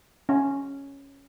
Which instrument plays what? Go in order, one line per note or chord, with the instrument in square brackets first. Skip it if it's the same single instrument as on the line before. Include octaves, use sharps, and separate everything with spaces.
[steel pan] C#4